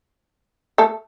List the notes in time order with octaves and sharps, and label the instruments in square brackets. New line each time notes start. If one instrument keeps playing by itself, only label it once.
[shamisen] A3 A4